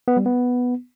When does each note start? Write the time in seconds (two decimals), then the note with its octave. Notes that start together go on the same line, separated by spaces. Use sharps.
0.08 B3
0.17 G3
0.26 B3